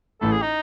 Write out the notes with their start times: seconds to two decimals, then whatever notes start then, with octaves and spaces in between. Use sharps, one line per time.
0.21 A1 A2 E3 A3 A4
0.31 G#4
0.42 D#4